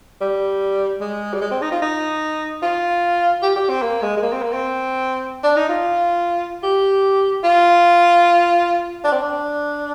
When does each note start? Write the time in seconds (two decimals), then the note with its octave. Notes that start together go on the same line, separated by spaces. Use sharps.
0.21 G3
1.01 G#3
1.33 G3
1.41 G#3
1.51 C4
1.62 D#4
1.72 F4
1.82 D#4
2.62 F4
3.42 G4
3.56 G4
3.70 C4
3.82 A#3
4.02 G#3
4.17 G#3
4.23 A#3
4.33 C4
4.43 A#3
4.53 C4
5.44 D4
5.56 D#4
5.69 F4
6.63 G4
7.44 F4
9.04 D4
9.13 C4
9.22 D4